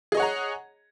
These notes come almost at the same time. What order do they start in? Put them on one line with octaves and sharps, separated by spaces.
G#4 D#5 C#5 F#5 A#5